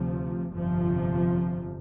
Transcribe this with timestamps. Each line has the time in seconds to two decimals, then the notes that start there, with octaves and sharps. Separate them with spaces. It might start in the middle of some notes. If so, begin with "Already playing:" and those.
Already playing: D2 C3 F3
0.53 G1 F2 C3 F3